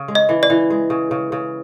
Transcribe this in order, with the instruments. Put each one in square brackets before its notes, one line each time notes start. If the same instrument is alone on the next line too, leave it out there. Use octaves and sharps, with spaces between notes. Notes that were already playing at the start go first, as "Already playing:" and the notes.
Already playing: [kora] C#3
G#3
[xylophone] D#5
[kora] E3
[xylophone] D5
[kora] E3
G#3
C#3
C#3
C#3